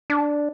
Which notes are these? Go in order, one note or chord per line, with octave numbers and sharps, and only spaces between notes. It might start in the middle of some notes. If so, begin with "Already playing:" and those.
D4